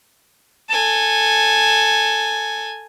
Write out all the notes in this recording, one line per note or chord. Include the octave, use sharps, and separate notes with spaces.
A4 G#5